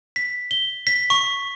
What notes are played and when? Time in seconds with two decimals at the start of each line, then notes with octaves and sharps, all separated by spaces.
0.16 B6
0.51 G7
0.87 B6
1.10 C#6